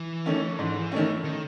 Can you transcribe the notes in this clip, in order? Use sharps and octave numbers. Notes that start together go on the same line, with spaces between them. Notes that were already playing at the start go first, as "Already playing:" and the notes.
Already playing: E3
D#3 A3 C#4
G#2
D#3 A3 C#4
D#3